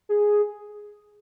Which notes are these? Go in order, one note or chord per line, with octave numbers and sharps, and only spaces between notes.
G#4